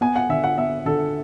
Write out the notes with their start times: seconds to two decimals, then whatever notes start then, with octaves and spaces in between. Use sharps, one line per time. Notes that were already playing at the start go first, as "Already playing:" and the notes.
0.01 B3 G#5
0.16 F#5
0.29 D3 E5
0.44 F#5
0.58 B3 E5
0.86 D3 A4